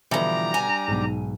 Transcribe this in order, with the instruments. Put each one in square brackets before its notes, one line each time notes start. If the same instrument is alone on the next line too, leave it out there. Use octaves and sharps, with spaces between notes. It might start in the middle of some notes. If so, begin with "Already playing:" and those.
[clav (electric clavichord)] B2 D3 [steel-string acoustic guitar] E3 F3 [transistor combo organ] G3 D4 [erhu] A#5
[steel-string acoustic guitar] G#5
[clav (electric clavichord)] B1 G#2